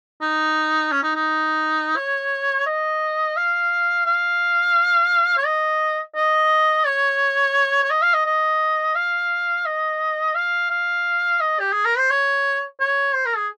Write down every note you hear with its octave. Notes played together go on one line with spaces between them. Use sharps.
D#4
C#4
D#4
D#4
C#5
D#5
F5
F5
C#5
D#5
D#5
C#5
C#5
D#5
F5
D#5
D#5
F5
D#5
F5
F5
D#5
G4
G#4
A#4
C5
C#5
C#5
C5
A#4
G#4